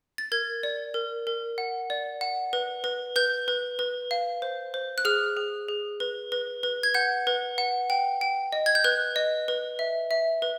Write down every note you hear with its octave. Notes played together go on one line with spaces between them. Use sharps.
A6
A#4 G#6
D5
A#4
A#4
F#5
D5
F#5
B4
B4
B4 G6
B4
B4
F5
C5
C5
F#6
G#4 F6
G#4
G#4
B4
B4
B4
G#6
F#5 G6
B4
F#5
G5
G5
D#5
G#6
G6
B4 F#6
D#5
B4
E5
E5
B4